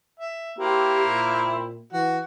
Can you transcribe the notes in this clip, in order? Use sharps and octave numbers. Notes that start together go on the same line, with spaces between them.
E5
A#3 C4 E4 G4
A#2
E3 F#4